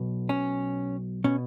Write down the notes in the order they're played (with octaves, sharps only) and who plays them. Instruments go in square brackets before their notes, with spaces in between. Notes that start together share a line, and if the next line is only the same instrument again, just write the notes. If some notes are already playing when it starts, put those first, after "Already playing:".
Already playing: [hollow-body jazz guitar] B1 B2
C#4
B2 C#4